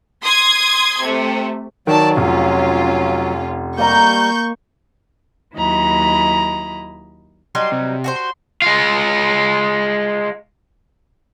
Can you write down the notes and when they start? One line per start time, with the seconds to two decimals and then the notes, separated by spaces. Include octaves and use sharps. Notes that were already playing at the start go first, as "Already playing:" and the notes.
0.23 C6 D#6 G#6
1.03 C3 A3
1.87 D#3 F#3 D5 A5
2.17 F1 C#4 F4
3.78 G3 A#3 D#5 A#5 C#6 G6
5.54 D#2 F#3 E4 D#5 A#5 B5
7.55 F#3 G3 D#4 C6
7.72 C3
8.04 F#4 G#4 C5
8.16 C6
8.62 G#3 F4